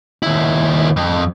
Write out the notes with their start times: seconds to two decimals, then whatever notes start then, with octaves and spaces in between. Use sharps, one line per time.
0.23 D#2 E4
0.97 F2